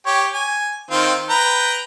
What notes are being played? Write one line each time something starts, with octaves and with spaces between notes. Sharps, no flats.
G4 C#5
G#5
D#3 C4 F4
B4 G5 A#5